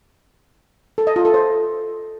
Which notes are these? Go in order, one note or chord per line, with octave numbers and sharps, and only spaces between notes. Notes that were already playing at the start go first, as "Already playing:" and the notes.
A4
D#5
F4
A4
C5